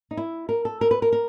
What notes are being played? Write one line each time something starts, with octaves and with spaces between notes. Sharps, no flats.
D#4
E4
A#4
A4
A#4
B4
A#4
A#4